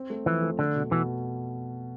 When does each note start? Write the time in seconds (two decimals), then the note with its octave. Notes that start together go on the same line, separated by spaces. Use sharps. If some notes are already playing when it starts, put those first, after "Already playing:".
Already playing: C4
0.10 A3
0.26 E3 F3
0.42 A3
0.59 D3 A3
0.75 B2
0.92 B2 E3